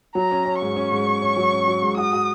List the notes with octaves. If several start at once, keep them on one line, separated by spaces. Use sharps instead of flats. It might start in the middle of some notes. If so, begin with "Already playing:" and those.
F#3 A#5
C#4
C#4
G#2 C#6
C#4
G#2
C#4
C#4
F#3
C#4
F#3
G#2
F#4 D#6
F#4